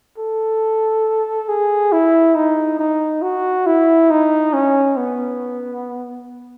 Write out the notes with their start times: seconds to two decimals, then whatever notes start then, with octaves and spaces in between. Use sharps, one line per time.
0.18 A4
1.49 G#4
1.92 E4
2.35 D#4
2.79 D#4
3.22 F#4
3.66 E4
4.10 D#4
4.53 C#4
4.97 B3